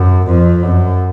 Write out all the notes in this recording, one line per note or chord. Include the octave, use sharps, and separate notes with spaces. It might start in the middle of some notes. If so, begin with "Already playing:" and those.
Already playing: F#2
F2
F#2